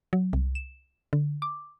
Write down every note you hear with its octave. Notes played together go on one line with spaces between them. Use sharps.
F#3
C2
E7
D3
D6